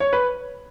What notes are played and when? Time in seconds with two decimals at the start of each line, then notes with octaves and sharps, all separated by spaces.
0.00 C#5
0.13 B4